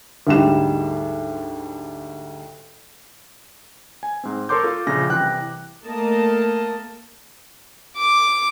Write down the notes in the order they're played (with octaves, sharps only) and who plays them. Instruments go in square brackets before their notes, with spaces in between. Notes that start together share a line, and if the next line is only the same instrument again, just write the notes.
[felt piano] D2 G#2 G3 E7
[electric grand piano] G#5
G#2 C4
A4 A#4 C#5 C6 D6 G6
F4 A4
A#1 C#3 F4 A#6
C2 E3 G5 F#6
[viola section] A3 A#3 A#4 D#5 A5
[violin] D6